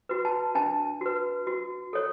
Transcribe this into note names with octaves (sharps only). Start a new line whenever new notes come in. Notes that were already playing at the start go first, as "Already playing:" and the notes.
F#4 B4
A5
D4 A5
F#4 B4
F#4
A4 C#5